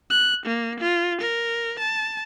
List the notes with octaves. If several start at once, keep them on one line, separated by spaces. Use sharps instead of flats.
F#6
A#3
F4
A#4
A5